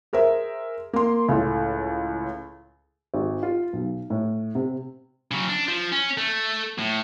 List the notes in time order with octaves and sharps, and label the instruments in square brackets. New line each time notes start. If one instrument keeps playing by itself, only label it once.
[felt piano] G#4 A#4 C5 E5
A#3 C6
C#2 A2 A4
G#1
F4
B1
A2
C3
[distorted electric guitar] C#3 F#3
D4
F3
C#4
A3
A2